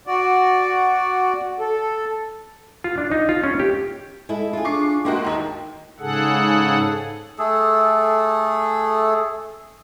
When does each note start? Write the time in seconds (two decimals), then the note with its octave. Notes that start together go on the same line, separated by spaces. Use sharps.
0.07 F#4 D5
1.60 A4
2.84 F4
2.98 D4
3.11 D#4
3.29 F4
3.44 C#4
3.60 G4
4.29 G#3 E4 A4
4.53 F4 G#4
4.65 D4 C#6 D6 C7
5.05 G#2 A#3 E4 F#4 D#5 G5
5.24 D#2 D#4
6.00 G#2 C#3 G#4 A4 F#5
7.39 A3 G#4 A4